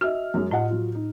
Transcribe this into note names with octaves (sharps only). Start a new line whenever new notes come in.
F#4 D#5 E5 F6
F#2 G#3
A2 F4 D#5 F#5
F#3 F4
D#4